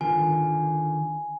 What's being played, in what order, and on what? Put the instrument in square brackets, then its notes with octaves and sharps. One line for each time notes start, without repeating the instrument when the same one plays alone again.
[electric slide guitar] D3 D#3 F4 [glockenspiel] G#5